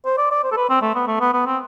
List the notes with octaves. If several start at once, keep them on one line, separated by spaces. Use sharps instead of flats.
C5
D5
D5
C5
A4
B4
C4
A3
B3
A3
B3
B3
C4